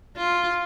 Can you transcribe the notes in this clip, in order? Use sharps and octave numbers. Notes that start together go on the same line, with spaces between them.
F4